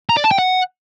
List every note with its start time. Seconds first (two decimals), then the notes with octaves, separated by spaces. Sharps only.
0.09 A#5
0.17 D5
0.24 A5
0.31 G5
0.39 F#5